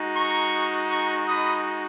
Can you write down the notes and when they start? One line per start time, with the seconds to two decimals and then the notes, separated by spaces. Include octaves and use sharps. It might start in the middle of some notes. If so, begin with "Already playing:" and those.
Already playing: G#3 D#4 F#4
0.15 A#5 C#6
0.90 A#5 C#6
1.27 B5 D#6